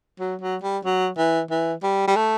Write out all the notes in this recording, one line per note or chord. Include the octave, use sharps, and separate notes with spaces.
F#3
F#3
G3
F#3
E3
E3
G3
G3
A3